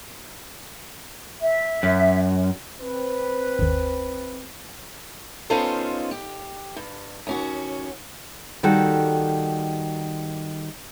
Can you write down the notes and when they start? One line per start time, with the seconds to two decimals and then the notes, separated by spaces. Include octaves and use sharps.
1.42 E5
1.83 F#2
2.79 C4 B4
3.59 G1 D#2
5.50 B3 C#4 D#4 F4 A4 C5
6.11 G4
6.76 G2
7.27 D#2 C#4 F#4
8.63 D#3 G3 F#4 A4